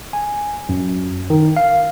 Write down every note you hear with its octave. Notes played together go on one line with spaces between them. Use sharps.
G#5
F#2
D#3
F5